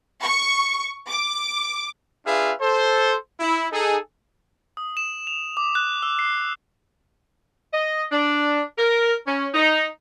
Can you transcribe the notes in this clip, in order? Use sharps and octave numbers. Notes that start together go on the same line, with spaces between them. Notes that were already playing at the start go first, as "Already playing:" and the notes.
C#6
D6
D4 F4 G#4 B4 E5 F5
A4 C5
E4
D#4 G#4 A4
D#6
E7
F7
D6
F#6
E6
C7
D#5
D4
A#4
C#4
D#4